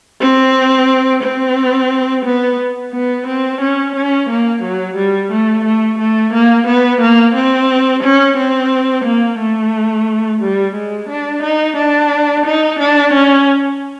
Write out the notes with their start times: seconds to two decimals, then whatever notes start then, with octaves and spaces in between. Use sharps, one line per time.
0.21 C4
1.23 C4
2.25 B3
2.93 B3
3.27 C4
3.61 C#4
3.95 C#4
4.29 A#3
4.62 F#3
4.97 G3
5.31 A3
5.65 A3
5.99 A3
6.33 A#3
6.67 B3
7.01 A#3
7.35 C4
8.03 C#4
8.37 C4
9.05 A#3
9.39 A3
10.40 G3
10.75 G#3
11.09 D4
11.43 D#4
11.76 D4
12.46 D#4
12.79 D4
13.13 C#4